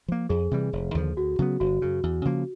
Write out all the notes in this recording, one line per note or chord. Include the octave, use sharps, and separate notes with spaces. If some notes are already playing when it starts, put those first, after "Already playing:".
F3 A#3
F2 G#4
C3 E3 G3
F1
D#2 D3 F3
D2 F#4
C#3 F#3 B3
G1 F#4
F#2 C#3
E2
C#3 F3 A#3